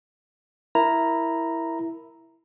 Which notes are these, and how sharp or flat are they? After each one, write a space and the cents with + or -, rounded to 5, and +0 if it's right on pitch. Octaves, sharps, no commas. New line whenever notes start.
E4 +0 A#4 +0 A#5 +0